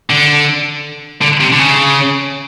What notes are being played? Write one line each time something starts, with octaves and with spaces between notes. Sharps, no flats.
D3
D3
C3
D3
C#3